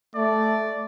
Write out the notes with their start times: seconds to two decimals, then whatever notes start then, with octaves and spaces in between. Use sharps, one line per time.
0.15 A3 D5